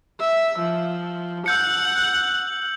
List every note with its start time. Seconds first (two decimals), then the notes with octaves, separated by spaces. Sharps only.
0.19 E5
0.58 F3
1.46 F#5 E6 G6 C#7
1.85 F#7